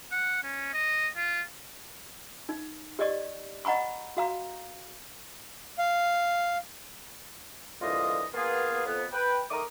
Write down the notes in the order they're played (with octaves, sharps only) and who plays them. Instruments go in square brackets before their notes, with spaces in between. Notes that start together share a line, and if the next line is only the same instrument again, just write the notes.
[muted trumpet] F#5
C#4
D#5
F4
[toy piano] D#4
G4 D5 D#5 C#6
D#5 F#5 A#5 B5 C#6
F#4 F5 A#5
[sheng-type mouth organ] F5
[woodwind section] C2 D3 E3 F4 D#5
A#3 B3 F4 G#4
F2 B3
B4 G5
D#3 A3 A#4 D6 D#6